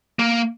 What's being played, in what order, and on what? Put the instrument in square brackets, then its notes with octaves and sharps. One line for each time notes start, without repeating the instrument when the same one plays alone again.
[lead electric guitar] A#3